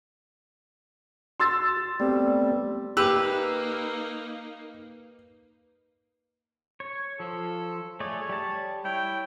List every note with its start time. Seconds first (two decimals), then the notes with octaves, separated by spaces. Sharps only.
1.40 F#4 C6 E6 A6
2.00 G3 A3 B3 C4
2.97 A#3 D#4 G4 B4 E6
6.80 C#5
7.20 F3 A4
8.00 A3 G#4 C#5 D5
8.29 G3 A5
8.85 E4 C#5 G5